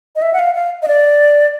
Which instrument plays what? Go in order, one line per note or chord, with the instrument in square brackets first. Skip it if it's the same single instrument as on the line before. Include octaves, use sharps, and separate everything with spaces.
[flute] D#5
E5
F#5
F5
F5
D#5
D5